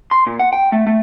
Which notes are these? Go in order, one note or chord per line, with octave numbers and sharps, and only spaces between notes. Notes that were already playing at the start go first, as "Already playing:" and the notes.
C6
A#2
F#5
G5
A3
A3